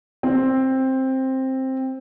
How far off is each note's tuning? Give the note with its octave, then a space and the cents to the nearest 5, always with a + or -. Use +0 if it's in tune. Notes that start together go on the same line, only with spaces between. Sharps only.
C4 +10